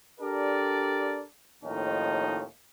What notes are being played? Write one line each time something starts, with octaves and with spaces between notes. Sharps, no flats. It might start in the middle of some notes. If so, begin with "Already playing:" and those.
D4 G4 A4 A#4 D5
D#2 A2 F3 C#4 D#4